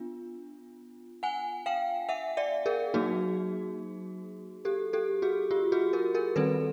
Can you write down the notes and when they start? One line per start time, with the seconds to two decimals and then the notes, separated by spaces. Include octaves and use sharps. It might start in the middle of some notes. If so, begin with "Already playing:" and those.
Already playing: B3 D4 F4
1.23 F#5 G#5
1.66 F5 G5
2.09 E5 F#5
2.37 D5 E5
2.66 G#4 A#4
2.94 F#3 A#3 D#4 F#4 G#4
4.65 G4 A4
4.93 G4 A4
5.22 F#4 G#4
5.51 F4 G4
5.72 F#4 G#4
5.93 G#4 A#4
6.14 G#4 A#4
6.36 D#3 G3 C4 A4 B4